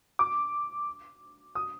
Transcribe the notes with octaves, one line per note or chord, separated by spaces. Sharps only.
D6
D#6